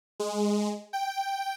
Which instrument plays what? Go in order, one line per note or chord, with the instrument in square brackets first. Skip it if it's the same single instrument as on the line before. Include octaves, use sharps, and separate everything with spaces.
[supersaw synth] G#3
G5